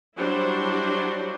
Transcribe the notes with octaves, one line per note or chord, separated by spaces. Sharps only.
F#3 G3 D4 E4 F#4 C5